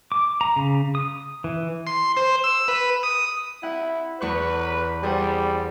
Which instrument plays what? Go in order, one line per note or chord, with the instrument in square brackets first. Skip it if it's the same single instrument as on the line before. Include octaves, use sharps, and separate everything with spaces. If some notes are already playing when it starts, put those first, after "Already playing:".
[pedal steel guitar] D6
A#5
C#3
D#6
E3
[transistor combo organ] C6
C5
E6
B4
D#6
[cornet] E4 [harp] F#5
[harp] E2 C#6 F#6 [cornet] B4
[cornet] G3 [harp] G#4 C5 F#5